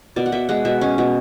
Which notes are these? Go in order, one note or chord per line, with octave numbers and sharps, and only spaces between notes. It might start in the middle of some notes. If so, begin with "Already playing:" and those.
B2 D5
F#5
B2 E5
G#3 F#5
B2 E5
C#4
B2